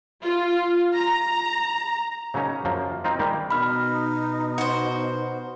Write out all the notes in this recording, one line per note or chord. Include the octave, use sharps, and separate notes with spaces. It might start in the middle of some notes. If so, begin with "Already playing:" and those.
F4
A#5
C#3 F#3 A#3 C#4 D#4
F#2 F3 A#3
A#3 C4 D#4 F4
D#3 G3 G#3 A#3 G4
B2 D#4 B5 F6
F#4 C5